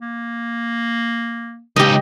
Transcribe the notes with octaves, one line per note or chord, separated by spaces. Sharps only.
A#3
C#2 D#4 G4 D#5